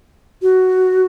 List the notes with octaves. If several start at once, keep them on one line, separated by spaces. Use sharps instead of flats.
F#4